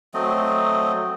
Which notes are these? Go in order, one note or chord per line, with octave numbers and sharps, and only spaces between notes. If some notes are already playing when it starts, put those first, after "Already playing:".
F#3 A3 C4 D#5